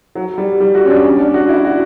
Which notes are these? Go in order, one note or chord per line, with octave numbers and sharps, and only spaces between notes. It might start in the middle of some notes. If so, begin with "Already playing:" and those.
F#3
G3
G3
F#4
C#4
D4
C#4
D4
F#4
E4
F#4